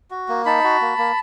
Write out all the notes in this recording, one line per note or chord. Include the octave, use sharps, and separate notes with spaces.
F#4
A#3
D#4 A5 B5
F#4
A#3
A#3